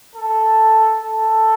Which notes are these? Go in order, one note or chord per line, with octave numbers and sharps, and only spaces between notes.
A4
A4